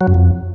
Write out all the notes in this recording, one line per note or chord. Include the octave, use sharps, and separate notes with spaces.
F#3
F#2
F2